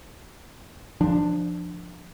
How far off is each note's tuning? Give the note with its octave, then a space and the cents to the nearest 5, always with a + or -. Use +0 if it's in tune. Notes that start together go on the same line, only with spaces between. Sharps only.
F3 +0 D4 +15